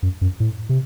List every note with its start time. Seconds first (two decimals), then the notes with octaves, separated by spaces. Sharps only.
0.03 F#2
0.21 F#2
0.40 A2
0.69 C3